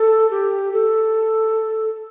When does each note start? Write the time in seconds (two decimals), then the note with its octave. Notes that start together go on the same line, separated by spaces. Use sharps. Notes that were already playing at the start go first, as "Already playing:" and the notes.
Already playing: A4
0.31 G4
0.73 A4